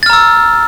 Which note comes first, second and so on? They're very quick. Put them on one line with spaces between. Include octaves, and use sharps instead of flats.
A6 F6 A#5 E6